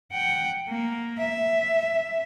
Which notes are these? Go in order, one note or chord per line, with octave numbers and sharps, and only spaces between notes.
F#5 G5
A#3
E5